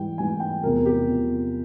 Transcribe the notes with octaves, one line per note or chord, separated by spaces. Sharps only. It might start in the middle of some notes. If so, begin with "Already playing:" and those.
Already playing: G#2 E3 G3 G5
G#2 E3 G3 G#5
G5
E2 C3 F3 A#4
G4
E2 C3 F3